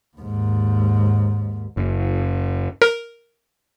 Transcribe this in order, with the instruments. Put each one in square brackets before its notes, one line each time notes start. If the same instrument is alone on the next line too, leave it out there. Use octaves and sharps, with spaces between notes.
[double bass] D#2 G#2
[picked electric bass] F#1
[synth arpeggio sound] A#4